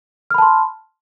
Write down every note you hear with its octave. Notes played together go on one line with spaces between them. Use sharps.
A5 B5 C6 F6